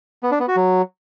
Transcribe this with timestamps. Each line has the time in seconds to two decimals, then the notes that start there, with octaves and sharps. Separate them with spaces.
0.23 B3
0.31 D4
0.40 B3
0.48 F#4
0.56 F#3